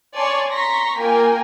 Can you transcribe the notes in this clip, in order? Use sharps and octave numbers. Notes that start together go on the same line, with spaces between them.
C#5 D5 G#5 A5 C6 C#6
A#5 C6 C#6 A#6 B6
A#3 F4 A#4 G5 G#5